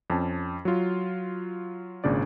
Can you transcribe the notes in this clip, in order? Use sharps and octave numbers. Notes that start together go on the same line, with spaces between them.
F2 C#4 A5
F#3 F4
G#1 A#2 C#3 D4 D5